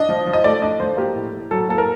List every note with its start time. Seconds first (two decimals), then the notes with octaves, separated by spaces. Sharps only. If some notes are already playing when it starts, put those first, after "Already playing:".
Already playing: D4 D#5
0.09 F3
0.26 F3
0.33 D#5
0.44 A3 D5
0.62 D4 D#5
0.80 F3 C5
0.97 A#3 G4
1.15 A2
1.33 A2
1.51 F#3 A4
1.69 A#3 A4
1.78 A#4